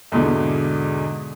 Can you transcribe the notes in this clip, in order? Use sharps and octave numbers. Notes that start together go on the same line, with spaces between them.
E2 G#2 B2 D3